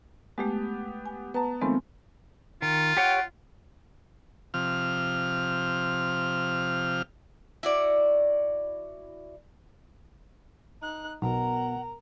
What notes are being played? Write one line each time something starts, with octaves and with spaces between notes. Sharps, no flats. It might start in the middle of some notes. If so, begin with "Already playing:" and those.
G#3 A3 B3 G4
G#5
B3 B4 A5 A#5
D#3 F3 G#3 A3 B3 C4
D#3 F4
G4 C#5 F#5 G5
C3 F3 F6
E4 F#4 D5
D#4 F#6
B1 B2 A#4 F#5 A#5